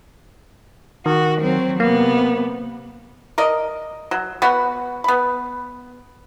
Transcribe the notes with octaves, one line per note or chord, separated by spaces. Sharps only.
D#3 F#4
F#3 C4
C3 A#3 B3
A#4 D5 D#5
F#3
B3 F#4 B4 F#5
B3 B5